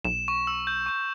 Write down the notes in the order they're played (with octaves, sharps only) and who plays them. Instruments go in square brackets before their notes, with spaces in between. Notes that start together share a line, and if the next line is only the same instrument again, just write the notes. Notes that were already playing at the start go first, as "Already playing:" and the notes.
[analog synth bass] B1 [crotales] E7
[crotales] C#6 E7
E6
G6
C#6 G6